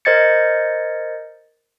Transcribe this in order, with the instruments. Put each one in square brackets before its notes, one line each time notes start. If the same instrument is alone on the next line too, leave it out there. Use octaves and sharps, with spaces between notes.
[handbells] A#4 C5 D#5 G#6 A6 C#7